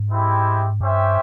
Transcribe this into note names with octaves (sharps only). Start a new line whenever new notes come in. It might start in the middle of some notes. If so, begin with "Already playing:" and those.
Already playing: G#2
G#3 C4 E4 G4
G2 C#4 G4 C5 E5 G5